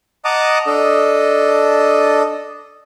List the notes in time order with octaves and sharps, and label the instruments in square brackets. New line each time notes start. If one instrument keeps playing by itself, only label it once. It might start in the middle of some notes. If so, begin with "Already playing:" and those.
[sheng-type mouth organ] D#5 F#5 A5 A#5 D6 D#6
D4 A4 D#5